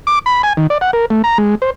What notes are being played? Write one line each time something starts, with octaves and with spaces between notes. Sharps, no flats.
D6
B5
G#5
D#3
D5
F#5
A#4
A3
A#5
G#3
C5